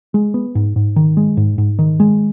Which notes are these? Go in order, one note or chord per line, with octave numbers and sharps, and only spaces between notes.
G#3
B3
G#2
G#2
D#3
G#3
G#2
G#2
D#3
G#3